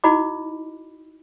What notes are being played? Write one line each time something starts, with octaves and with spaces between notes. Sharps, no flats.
D#4 E4 F#4 D#5 B5 D6